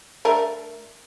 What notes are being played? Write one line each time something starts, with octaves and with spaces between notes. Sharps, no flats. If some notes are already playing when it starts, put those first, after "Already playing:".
A3 D4 A#4